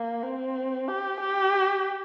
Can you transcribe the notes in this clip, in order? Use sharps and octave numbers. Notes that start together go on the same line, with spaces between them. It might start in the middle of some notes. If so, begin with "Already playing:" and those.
Already playing: A#3
C4
G4
G4